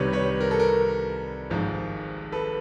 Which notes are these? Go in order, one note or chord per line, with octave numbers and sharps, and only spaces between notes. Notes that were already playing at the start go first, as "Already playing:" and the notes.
Already playing: C2 C3 D#3 G3 B4 C#5
B4 C#5
A#4
A4
A#4
G#1 G#2 F3
A4 B4